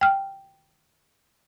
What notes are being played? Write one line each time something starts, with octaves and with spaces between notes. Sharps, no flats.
G5 F6